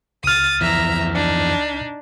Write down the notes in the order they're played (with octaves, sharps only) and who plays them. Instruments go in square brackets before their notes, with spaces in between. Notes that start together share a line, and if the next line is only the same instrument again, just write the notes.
[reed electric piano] C#2 F6 [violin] D#6 A6
[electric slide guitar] F2 E3 [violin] E5 A#5
[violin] D4 D#4